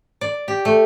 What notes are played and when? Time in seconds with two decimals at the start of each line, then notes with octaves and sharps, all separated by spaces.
0.21 D5
0.48 G4
0.65 A3